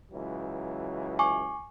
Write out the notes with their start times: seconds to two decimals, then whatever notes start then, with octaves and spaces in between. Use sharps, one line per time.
0.12 C#2 E3 F#3
1.19 G#5 C#6 D6